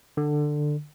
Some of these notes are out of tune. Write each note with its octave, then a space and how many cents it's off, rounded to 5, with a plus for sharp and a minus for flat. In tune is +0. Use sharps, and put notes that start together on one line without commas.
D3 +15